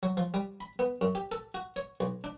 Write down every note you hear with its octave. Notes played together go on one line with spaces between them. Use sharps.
F#3
F3
G3
B5
B3
F#2
G4
A4
F#4
C#5
B1
D4